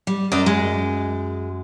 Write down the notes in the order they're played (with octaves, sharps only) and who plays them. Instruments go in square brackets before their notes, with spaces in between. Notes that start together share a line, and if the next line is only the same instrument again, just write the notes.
[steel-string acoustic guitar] G3
[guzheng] F#2 D#5 A#5 [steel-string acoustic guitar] D5
[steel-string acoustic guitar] G#3